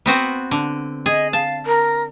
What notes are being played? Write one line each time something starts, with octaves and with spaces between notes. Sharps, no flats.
B3 C4 F#4
D3
G#4 D#5
F5 A5
A#4